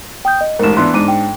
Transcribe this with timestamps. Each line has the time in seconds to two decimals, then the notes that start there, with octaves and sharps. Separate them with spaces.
0.25 G5 D#6 G6
0.41 D#5
0.59 A1 G#2 A#4 E7
0.77 E3 B3 D4 C6
0.94 G#2 D4 D6 D#7
1.08 G5